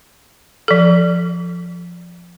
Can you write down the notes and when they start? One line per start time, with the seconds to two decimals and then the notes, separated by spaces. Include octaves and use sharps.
0.68 F3 A4